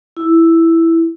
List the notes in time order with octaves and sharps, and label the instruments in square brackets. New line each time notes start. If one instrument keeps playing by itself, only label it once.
[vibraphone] E4